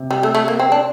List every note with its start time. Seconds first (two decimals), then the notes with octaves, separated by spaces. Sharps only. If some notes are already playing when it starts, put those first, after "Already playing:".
Already playing: C3
0.11 G3
0.23 A3
0.35 A3
0.48 A#3
0.60 C4
0.72 D4